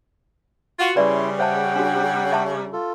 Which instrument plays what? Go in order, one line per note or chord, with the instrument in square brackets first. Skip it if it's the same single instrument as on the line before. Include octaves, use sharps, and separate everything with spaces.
[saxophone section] F4 F#4
[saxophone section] C#3 G3 [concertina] C#4 E4 C6 [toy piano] B4 D5 E5
[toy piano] C5 E5 A5 [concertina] F#5 G5
[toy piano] D4 F#4
E5 A5 C#6
[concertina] F4 A4